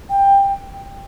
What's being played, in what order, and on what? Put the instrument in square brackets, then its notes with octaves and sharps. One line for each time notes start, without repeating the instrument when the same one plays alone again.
[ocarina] G5